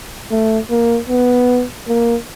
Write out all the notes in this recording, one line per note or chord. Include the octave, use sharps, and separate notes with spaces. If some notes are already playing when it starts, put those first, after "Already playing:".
A3
A#3
B3
A#3